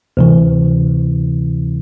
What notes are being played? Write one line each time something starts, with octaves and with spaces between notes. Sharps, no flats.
D2 C3 E3